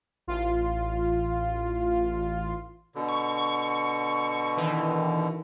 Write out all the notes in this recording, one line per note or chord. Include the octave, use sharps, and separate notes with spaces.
A1 F4
B2 D3
C#6
D#3 E3